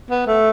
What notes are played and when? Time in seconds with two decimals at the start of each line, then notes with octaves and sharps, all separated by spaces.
0.10 B3
0.27 A3